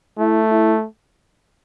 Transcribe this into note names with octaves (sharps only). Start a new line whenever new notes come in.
A3 E4
E4